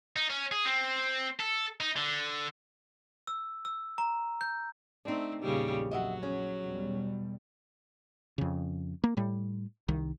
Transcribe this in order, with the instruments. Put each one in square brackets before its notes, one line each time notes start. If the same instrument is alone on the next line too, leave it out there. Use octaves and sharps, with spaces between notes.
[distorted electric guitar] D#4
C#4
G#4
C4
A4
D#4
D3
[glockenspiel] E6
E6
A#5
G6
[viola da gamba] A3 C4 [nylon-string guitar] D4 D#4
[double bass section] A#1 E2 [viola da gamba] A#2 C#3 G3
[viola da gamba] F#3 [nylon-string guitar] D#5 E5 F#5
[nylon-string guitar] C#4 G#4
[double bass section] E2 B2 G3
[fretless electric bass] F2 C#3
A#3
A2 G3
C2 D#3